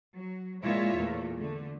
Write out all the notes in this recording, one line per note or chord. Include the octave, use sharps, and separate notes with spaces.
F#3
A#2 G#3 E4 F4 C#5 E5
E2 A#2 A3
D3 A3